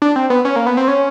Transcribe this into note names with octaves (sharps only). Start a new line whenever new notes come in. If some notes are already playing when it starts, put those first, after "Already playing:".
D4
C4
B3
C#4
A#3
B3
C4
C#4